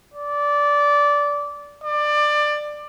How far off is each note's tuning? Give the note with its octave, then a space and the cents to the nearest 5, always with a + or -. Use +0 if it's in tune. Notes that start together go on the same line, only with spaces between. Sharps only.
D5 -15
D5 +20